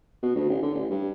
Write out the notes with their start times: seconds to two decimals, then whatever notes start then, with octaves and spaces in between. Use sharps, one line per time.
0.23 B2
0.35 D2
0.50 A1
0.62 D3
0.74 A1
0.90 G2